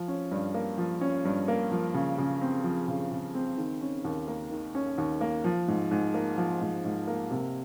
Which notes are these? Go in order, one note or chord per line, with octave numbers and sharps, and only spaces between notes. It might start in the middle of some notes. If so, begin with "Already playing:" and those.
Already playing: F3
C#4
G2
A#3
F3
C#4
G2
A#3
F3
C#3
C#3
C4
F3
C#3
C#3
C4
D#3
C#4
D#2
A#3
D#3
C#4
D#2
A#3
F3
G#2
G#2
A#3
F3
G#2
G#2
A#3
C3